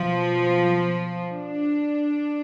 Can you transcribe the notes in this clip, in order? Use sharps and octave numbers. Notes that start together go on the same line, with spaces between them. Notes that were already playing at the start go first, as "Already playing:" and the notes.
Already playing: B2 F3
D4